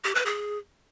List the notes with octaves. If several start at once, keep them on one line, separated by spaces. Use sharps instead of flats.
G4
B4
G#4